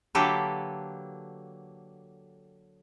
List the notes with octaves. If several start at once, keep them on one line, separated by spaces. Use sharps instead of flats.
D3 F#3 A#3 G4 A4 B4